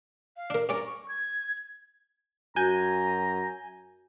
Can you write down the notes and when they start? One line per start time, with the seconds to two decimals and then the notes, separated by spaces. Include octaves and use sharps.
0.37 F5
0.50 D4 A#4
0.69 G2 C#4 A#4 D5
0.86 C#6
1.08 G#6
2.56 F#2 F#4 G#5 A#5 G6